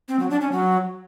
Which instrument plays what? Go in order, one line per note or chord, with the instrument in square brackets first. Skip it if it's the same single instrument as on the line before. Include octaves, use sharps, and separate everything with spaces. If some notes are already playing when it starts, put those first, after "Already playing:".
[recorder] C4
F#3
D4
C#4
F#3